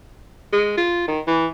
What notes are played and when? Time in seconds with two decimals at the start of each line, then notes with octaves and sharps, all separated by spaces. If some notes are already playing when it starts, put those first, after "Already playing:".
0.53 G#3
0.77 F4
1.08 D#3
1.27 E3